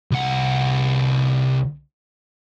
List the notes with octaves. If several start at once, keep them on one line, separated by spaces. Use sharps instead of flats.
C2 F#5